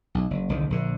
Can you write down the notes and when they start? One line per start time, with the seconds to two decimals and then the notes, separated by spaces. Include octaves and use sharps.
0.15 B1
0.31 F#1
0.49 F#1 C2 D3 D#3
0.70 A#1 D3